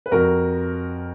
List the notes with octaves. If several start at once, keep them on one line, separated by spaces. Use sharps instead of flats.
B4
F2 F#4 A#4